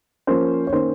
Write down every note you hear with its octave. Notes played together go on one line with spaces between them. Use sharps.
F3 A#3 C#4 C5
C#5
D#3 A#3 C#4 C5